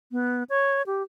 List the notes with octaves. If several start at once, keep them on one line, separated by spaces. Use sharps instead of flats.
B3
C#5
G4